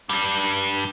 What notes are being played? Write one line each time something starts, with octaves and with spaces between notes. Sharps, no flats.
G2 G3